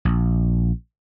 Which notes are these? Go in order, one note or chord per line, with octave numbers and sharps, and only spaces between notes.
A#1